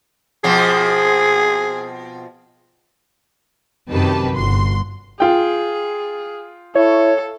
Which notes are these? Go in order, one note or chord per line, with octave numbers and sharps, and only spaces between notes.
B2 F3 C4 G#4
F#2 C3 D#3 G4 B4 A5
G1 F#4 C6
F4 G#4 G5
E4 A4 C#5